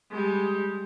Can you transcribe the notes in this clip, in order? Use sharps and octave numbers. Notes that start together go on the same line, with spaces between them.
G3 G#3